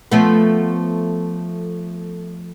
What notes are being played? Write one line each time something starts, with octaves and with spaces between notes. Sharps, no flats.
F3 A3 B3